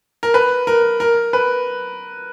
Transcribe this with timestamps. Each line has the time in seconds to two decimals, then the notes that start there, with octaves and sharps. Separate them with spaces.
0.23 A#4
0.34 B4
0.67 A#4
1.00 A#4
1.33 B4